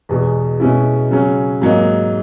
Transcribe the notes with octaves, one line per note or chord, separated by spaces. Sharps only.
E2 B2 G#3
B2 G#3 C#4 E4
C#3 F#3 C#4
G#2 F#3 A#3 D#4